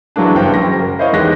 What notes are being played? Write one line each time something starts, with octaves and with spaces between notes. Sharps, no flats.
E3 F#3 G#3 A#3 D4
F#1 G2 C5 G5
F#1 F#3 A#6
A#4
E4 C5 C#5 D#5 F5 C#6
E2 D#3 G#3 G4 F#6 A#6